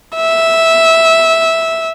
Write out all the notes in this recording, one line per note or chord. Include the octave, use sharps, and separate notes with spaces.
E5